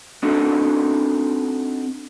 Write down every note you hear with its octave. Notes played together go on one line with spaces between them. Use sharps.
C4 D4 D#4 F#4 A4